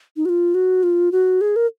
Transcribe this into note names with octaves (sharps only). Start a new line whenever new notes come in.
D#4
F#4
F4
F#4
F4
F#4
G#4
A#4